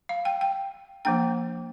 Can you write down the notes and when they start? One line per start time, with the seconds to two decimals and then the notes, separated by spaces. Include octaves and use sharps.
0.09 F5
0.25 G5
0.41 G5
1.05 F3 A#3 D4 G5